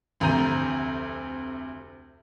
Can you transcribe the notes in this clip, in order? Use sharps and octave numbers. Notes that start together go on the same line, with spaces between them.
F1 D2 C3 A#5 G6 D#7